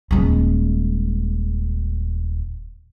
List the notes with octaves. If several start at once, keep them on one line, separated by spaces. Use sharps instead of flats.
D#1 G#3